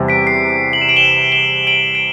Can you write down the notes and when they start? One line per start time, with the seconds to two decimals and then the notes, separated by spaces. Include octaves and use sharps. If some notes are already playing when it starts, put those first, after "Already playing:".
Already playing: E2 C3 G3
0.08 B6 D7
0.27 C7
0.73 F#7
0.81 E7
0.89 D7 F#7
0.97 E7 G7
1.32 E7 G7
1.67 D7 F#7
1.95 D7